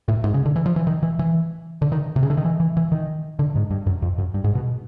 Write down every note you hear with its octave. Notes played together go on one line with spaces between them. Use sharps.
A2
G#2
C#3
D3
E3
F3
E3
D#3
E3
E3
D3
D#3
C3
C#3
D3
D#3
E3
E3
E3
D#3
D3
G#2
G2
F#2
F2
F#2
G2
G#2
B2